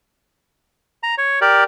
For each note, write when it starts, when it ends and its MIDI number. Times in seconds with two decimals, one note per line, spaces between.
1.03 1.15 82
1.18 1.39 73
1.41 1.64 67
1.41 1.64 70
1.41 1.64 74